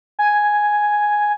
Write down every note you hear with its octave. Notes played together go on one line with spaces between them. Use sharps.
G#5